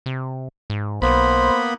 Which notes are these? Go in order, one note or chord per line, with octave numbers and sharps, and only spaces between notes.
C3
G#2
B1 A#3 B3 C5 B5